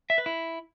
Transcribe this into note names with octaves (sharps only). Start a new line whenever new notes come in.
E5
B4
E4